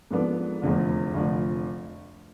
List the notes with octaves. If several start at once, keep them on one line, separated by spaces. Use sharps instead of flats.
G#2 F3 B3 D4 A4
F1 E2 D3 F3
F1 D3 F3